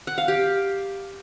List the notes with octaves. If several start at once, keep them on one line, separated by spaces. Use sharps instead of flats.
F#5
F5
G4